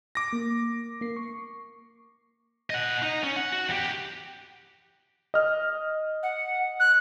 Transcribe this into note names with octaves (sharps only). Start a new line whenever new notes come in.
D6 A#6
A#3
A#3 C7
C#6
D#5 F#5
D#4
C#4
F#5
F#4
E2 G4
D#5 F6
F#5
F#6